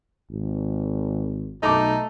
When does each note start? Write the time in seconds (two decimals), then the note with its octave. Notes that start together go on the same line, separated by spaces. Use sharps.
0.31 G#1
1.63 B1 A3 D#4 A#5 D6